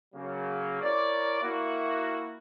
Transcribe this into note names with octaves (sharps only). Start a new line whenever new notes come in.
C#3 F#3 A#3
E4 A#4 C#5 D5
A#3 E4 F#4